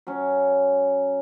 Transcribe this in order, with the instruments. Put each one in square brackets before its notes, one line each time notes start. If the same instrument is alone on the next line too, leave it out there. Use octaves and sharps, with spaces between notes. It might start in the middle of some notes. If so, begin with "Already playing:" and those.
[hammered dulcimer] F#3 C#4